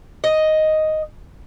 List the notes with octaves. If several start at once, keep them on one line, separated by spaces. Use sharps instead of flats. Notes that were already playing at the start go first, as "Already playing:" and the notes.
D#5